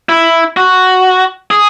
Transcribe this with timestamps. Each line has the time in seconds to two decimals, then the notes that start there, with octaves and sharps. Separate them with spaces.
0.09 E4
0.57 F#4
1.51 G#4